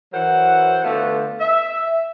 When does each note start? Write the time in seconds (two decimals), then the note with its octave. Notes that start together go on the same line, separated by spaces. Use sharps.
0.13 E3 F#3 A#4 C5 F#5
0.84 D3 A3 B3 F4 F#4 A4
1.40 E5